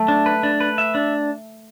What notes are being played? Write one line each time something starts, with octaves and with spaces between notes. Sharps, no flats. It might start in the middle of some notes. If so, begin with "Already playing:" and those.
Already playing: A3
D4
B4
D4
B4
E5
D4